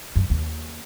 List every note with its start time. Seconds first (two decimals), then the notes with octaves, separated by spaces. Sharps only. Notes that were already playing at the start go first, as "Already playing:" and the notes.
0.16 F#2
0.30 D#2